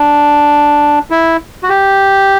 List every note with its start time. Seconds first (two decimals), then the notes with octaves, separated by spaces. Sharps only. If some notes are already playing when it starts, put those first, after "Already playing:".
Already playing: D4
1.10 E4
1.63 F#4
1.69 G4